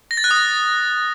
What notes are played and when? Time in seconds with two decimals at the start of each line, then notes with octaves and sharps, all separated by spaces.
0.11 A#6
0.17 A6
0.24 F#6
0.31 D#6